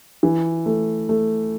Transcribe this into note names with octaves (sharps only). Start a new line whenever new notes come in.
E3
A3
A3